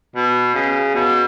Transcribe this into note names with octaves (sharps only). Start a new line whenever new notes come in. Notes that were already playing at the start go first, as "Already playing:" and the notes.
B2
C#3
B2